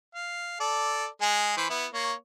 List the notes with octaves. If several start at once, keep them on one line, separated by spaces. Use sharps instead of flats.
F5
A4 D5
G#3 G#4
E3 C5 B5
B3 E4
A#3 C#5